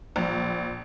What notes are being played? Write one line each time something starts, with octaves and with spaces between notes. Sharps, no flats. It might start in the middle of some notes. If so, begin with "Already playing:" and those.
A#1